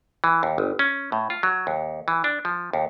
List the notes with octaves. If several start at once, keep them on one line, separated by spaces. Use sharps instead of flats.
E3
D#2
G1
C#4
A2
F4
F#3
D#2
E3
D4
F3
D#2